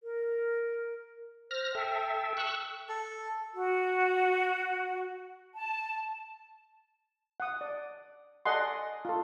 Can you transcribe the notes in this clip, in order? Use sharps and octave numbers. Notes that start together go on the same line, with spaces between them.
A#4
C5 F6 A#6
A4 E5 G5
C#6 E6 F#6
A4
F#4
A5
F#5 D#6
D5
A4 D5 D#5 F#5 G#5 C6
F4 A4